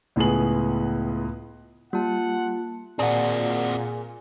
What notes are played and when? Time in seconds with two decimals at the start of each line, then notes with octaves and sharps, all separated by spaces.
0.16 C#2 A2 B3 G#4 F#7
1.93 G3 A#3 F4 F#5 A5
2.99 A#2 C4 F#4 G#4 D5 F#5